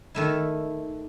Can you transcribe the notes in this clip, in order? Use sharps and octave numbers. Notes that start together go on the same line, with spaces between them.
D#3 A3 E4